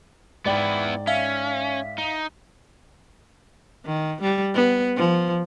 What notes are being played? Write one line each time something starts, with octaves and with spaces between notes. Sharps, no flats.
G#2 B3 E4 D5 G5
C#4 E5 F5 B6
D#4
D#3
G3
B3
F3